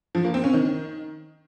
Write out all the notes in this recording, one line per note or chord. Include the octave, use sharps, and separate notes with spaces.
F3
A#3
C4
C#4
D#3